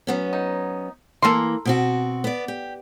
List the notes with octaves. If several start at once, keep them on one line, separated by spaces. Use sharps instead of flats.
F#3 B3 C#4
D#4
E3 A#3 A4 A#4 C6
B2 C4 F#4
B3 D5
G4